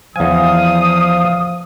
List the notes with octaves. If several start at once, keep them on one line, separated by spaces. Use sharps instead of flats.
E2 F3 F5 G#5 D#6